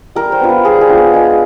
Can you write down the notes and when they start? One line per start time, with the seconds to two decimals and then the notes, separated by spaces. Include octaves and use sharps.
0.15 G3 A#4
0.32 C5
0.40 B3 D4 F4 B4
0.49 A#4
0.65 G3 G#4
0.81 G#4
0.89 B3 D4 F4
0.98 G#4
1.13 G#3 G#4